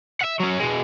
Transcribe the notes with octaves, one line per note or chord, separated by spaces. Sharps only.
E5 F#5
F#3 C#4
B2 G#3